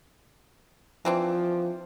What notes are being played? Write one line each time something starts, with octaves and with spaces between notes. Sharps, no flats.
E3 F3 C4 D4